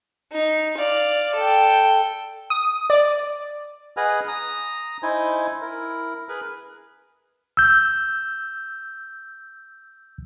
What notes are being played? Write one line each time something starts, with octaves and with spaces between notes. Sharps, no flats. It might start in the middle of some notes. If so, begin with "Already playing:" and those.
D#4
D5 F5
A4 G5
D#6
D5
G#4 B4 D#5 F#5 G#5 F6
A#5 D#6
D#4 E4 C5 G#5
E4 A#4
G#4 A#4 B4
E6 G6